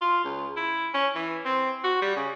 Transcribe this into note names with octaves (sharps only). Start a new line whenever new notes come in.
F4
C#2
E4
C#4
E3
C4
F#4
G3
C#3